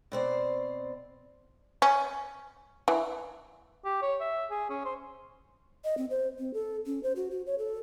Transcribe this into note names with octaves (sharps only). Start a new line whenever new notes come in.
B2 C4 C5 D5
C#4
E3
G4
C#5
E5
G#4
C#4
C5
D#5
C4
C5
C4
A4
C#4
C5
F#4
F#4
C#5
A4